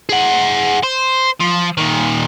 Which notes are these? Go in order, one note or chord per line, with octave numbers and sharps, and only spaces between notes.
G#4 F#5
C5
F3
A#2 D#3